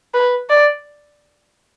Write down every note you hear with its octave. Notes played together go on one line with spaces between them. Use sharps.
B4
D5